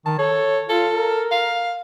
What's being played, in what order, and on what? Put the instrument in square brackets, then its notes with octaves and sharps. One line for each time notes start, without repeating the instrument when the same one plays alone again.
[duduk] D#3 [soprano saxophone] A5
[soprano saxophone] A4 [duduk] C#5
[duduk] F4 [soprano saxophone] A4
[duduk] A#4
[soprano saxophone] F5